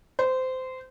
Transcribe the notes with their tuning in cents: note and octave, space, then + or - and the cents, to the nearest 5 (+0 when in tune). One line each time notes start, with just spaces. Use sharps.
C5 -20